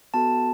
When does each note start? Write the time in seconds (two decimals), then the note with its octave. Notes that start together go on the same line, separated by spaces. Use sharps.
0.14 B3 F#4 A4 A5